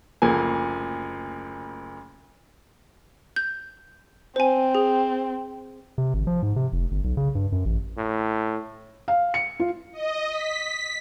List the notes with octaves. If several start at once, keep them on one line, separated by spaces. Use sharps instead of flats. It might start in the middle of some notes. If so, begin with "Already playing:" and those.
F#1 D2 F3 A#3 G#5
G6
C4 C5 G#5
G#4
C3
G#1
F3
G#2
C3
F1
G1
B1
C#3
G2
F#2
A1
A2
F5
C#7
F4
D#5
B6